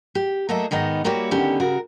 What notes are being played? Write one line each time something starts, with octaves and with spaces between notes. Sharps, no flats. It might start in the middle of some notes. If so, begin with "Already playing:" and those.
G4
F#3 A3 A#3 A4 D#5 E5
G#2 D#3 B3 D#4
G3 A#3 E4 F#4 G4 C#5
D3 D#3 B3 C#4 G4
C#3 F#4 A#4